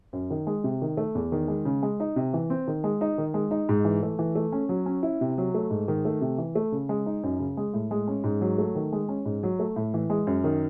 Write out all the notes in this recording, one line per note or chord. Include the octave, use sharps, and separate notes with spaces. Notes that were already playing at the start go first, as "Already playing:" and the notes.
F#2
D#3
G#3
C3
D#3
A3
E2
D#3
G#3
C#3
G#3
D#4
C3
E3
C4
D#3
G#3
D#4
D#3
G#3
D#4
G#2
E3
A3
E3
A3
C#4
F#3
C#4
E4
C3
F#3
A3
G#2
D#3
A3
C3
E3
A3
C#3
G#3
D#4
F#2
C#3
G#3
A2
G#3
C#4
G#2
F#3
A3
D#3
G#3
C#4
G#2
F#3
A3
A2
E3
G#3
F#2
D#3